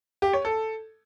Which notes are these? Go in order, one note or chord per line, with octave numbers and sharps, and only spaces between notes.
G4
C#5
A4